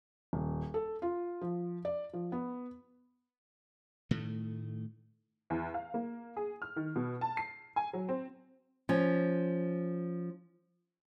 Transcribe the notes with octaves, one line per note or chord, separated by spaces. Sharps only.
D#1
A4
F4
F3
D5
F3
B3
A2 D#3 A3
E2
F5
A#3
G#4
F6
D#3
B2
A5
C7
G#5
F#3
C4
F3 C#4